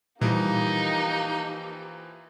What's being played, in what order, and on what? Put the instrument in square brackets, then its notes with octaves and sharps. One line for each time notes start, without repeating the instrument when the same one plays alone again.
[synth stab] A#2 G3 [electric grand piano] E3 F3 [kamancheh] A#3 G4 [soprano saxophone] D#4